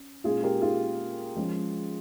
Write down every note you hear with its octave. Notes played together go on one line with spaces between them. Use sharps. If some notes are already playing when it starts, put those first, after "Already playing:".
Already playing: C#4
A#2 G#3 C#4 F4 G#4
G4 A#4
F4 G#4
F3 G#3 C#4